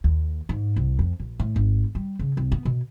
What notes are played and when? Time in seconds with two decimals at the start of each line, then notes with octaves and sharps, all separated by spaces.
0.04 D#2
0.49 G#2
0.76 C2
0.99 F2
1.20 A#1
1.39 A2
1.56 G#1
1.95 G3
2.19 C#3
2.37 C2
2.52 B3
2.65 B2